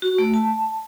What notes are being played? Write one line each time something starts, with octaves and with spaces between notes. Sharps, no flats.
F#4
A3
A5